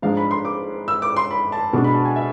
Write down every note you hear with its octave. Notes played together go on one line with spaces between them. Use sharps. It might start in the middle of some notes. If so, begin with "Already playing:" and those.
G#2 F3 G#3 D4 F5
B5
C6
D6
E6
D6
C6
B5
A5
B2 G#3 D4
B5
A5
G#5
E5